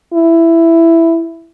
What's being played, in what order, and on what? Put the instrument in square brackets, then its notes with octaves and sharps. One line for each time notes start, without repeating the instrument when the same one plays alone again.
[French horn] E4